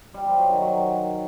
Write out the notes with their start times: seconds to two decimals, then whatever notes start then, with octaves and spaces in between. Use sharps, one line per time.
0.14 G3
0.26 F3
0.38 F#3
0.50 D#3
0.62 F#3